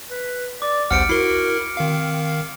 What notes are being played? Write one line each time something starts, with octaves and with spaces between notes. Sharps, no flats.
B4
D5 D6
A#1 D#2 C5 F#5 F6 C#7 D7
E4 F#4 A#4 C7 G7
D#3 C4 F5